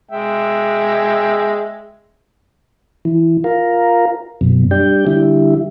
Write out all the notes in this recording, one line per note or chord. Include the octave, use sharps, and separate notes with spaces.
G#3 E5 G5
E3
F4 A#4
F#2 B2
G3 D4 G5
D3 G3 E4